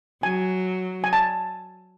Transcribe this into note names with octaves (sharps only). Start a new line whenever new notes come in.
F#3 G#5
G#5
A5